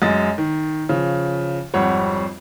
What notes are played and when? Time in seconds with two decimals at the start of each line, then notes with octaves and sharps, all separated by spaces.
0.02 F#2 G#3 D#5 A6
0.38 D#3
0.89 C#3 F3
1.74 G#1 F2 G3 C#5 F#5